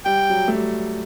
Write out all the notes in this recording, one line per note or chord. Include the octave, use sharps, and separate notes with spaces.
G3 G5
F#3
A3
G3